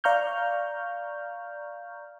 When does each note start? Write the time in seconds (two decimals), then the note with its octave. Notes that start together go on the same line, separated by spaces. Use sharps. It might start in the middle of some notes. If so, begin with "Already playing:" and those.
0.04 D5 F5 A#5 C#6 F6 G6